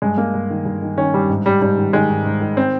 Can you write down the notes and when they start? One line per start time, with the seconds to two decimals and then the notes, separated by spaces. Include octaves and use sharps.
0.02 G2 G#3
0.18 G2 A#3
0.34 G2
0.50 D#3
0.65 G2
0.82 D#3
0.97 D#3 C#4
1.14 G2 G3
1.29 G#2
1.46 G#2 G3
1.61 G#2 G3
1.78 D#3
1.93 D#3 G#3
2.10 G#2
2.25 G#2
2.41 D#3
2.57 C4